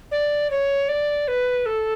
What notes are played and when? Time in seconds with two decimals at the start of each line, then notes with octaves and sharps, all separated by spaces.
0.11 D5
0.51 C#5
0.89 D5
1.28 B4
1.66 A4